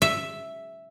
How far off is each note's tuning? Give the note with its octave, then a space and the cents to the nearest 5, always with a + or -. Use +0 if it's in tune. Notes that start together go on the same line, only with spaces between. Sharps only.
E5 +0